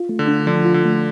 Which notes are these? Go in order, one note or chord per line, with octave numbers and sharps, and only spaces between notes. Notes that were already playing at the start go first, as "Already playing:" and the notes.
Already playing: F4
A3
D3
D4
D3 F3
F4
D3
A3